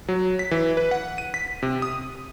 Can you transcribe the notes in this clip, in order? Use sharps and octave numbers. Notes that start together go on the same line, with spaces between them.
F#3
B6
E3
B4
F#5
D#7
B6
C3
D#6